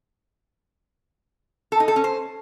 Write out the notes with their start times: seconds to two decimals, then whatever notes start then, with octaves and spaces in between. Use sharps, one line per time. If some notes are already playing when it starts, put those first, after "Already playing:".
1.72 A4
1.80 D#4
1.88 A4
1.96 C#4
2.04 C5